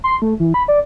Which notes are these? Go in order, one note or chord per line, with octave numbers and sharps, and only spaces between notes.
C6
A3
E3
B5
D5